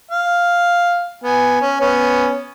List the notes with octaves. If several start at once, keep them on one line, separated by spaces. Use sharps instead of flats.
F5
B3 G#5
C#4
B3 C#4